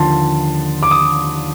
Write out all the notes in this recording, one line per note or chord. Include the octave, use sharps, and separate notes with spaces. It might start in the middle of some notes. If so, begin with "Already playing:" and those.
Already playing: D#2 D3 F3 A5 C6
D6
D#6